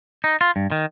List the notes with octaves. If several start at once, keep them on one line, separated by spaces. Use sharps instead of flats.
D#4
F4
G2
D#3